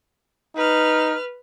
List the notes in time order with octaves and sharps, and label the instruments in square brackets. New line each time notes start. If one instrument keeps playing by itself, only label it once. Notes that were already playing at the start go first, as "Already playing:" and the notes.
[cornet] D#4 [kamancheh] B4 F6